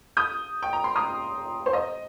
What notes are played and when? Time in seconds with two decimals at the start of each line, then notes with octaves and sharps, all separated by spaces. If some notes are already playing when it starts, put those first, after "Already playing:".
0.17 D#6 G6
0.62 G5
0.73 A#5
0.84 C6
0.96 A#5 D#6
1.66 C5
1.73 D#5